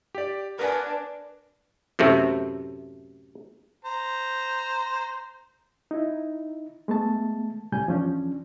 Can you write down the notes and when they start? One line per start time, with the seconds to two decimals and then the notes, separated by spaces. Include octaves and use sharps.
0.15 G4 D5
0.59 D4 A#4 B4 G#5
1.99 F#2 A2 C3 A3
3.85 C5 A#5
5.91 D#4 E4
6.88 G#3 A3 B3 A5
7.72 C#2 A2 G3 G#5 G6
7.87 E2 F3 C#4 D4